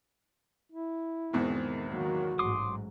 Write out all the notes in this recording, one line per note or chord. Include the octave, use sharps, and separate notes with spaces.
E4
E2 G#2 B2 D3 D#3 C4
D#3 F#3 A#3 F#4
A1 G#2 F#3 C6 D6 D#6